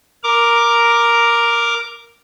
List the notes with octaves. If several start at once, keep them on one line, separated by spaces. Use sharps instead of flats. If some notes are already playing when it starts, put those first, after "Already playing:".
A#4 A#5 D6